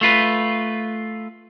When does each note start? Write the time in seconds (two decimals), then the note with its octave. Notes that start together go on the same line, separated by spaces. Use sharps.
0.01 A3 F4 B4